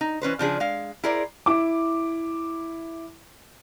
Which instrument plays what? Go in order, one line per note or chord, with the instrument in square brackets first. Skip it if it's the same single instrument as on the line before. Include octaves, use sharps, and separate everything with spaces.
[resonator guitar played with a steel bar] D#4
E3 C#4 B4 C5
C#3 F3 D4 G#4
G#3 F5
E4 G#4 A#4 C5 D5
[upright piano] E4 D6